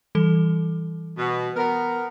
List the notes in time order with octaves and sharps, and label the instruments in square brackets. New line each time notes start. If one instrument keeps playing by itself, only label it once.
[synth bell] E3 G3 A4
[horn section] B2
B3 A#4